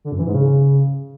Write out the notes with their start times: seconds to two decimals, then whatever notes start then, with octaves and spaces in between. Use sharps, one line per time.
0.05 D3
0.12 F#2
0.19 E3
0.27 G#2
0.34 C#3